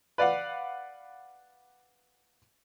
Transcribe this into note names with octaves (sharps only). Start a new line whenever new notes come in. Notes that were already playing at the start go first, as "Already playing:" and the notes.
B4 D5 F5 F#5